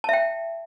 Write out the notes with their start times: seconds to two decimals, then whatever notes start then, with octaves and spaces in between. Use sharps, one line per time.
0.04 A5
0.09 E5
0.13 G5